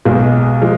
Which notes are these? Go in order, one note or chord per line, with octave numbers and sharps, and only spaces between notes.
B1 B2 G#3
F3 G#3